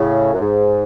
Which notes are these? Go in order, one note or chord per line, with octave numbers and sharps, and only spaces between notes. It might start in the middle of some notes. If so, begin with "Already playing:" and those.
Already playing: A2 C#3
F#2
G#2